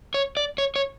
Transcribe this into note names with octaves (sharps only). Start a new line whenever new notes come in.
C#5
D5
C#5
C#5